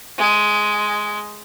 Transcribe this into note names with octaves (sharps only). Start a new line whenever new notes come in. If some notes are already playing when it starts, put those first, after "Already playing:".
G#3